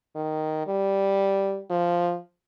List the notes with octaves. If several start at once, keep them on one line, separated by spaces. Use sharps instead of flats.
D#3
G3
F3